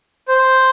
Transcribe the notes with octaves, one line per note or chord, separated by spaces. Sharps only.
C5